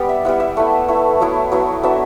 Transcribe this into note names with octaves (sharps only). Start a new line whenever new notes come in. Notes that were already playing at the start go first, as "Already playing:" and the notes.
Already playing: G3 B3 D5
E5
G3 B3 E4 F#5
E5
A3 E4 F#5
A3 E4
F#3 B3 E4
F#3 B3 E4
F#3 B3 D4 E5